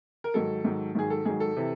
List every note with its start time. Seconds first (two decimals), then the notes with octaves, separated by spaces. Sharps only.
0.24 A#4
0.34 G#2 D#3 F#3 A4
0.64 G#2 D#3 F#3
0.95 G#2 D#3 F#3 G#4
1.10 A4
1.25 G#2 D#3 F#3 G#4
1.40 A4
1.57 C3 E3